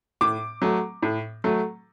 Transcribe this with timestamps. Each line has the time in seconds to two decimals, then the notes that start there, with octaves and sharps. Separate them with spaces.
0.21 A2 D6
0.62 F#3 A3
1.02 A2
1.44 F#3 A3